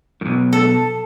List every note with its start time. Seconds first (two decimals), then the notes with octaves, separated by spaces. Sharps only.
0.21 B1 F#2
0.53 A4 A5